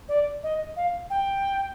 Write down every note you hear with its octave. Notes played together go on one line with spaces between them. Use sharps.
D5
D#5
F5
G5